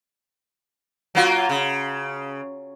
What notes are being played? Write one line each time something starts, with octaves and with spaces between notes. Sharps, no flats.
F#3 A#3 F4
C#3